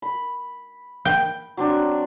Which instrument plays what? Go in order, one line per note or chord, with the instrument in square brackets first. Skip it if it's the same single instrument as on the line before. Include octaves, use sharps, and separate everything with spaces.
[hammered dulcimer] B5
[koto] G5
[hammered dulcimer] F#3 C4 D4